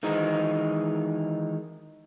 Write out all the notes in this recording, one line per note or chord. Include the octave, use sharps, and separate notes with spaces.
D#3 E3 G#3 D#4